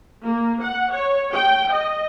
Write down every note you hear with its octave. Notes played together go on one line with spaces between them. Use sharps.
A#3
F#5
C#5
G5
D#5